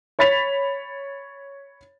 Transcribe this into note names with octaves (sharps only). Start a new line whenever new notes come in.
C#5 B5 A6 B6 F7